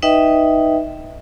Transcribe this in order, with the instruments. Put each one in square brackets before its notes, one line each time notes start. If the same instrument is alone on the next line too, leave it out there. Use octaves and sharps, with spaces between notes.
[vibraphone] D#4 B4 D#5 E5 G5